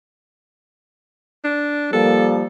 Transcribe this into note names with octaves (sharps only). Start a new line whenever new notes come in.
D4
F3 G3 A#3 A4